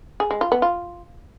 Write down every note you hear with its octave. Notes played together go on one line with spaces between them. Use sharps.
G#4
G#3
F4
B3
F4